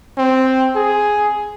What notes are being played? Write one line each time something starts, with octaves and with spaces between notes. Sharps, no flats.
C4
G#4